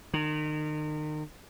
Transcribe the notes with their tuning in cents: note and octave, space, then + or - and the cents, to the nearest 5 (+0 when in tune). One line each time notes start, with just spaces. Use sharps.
D#3 -35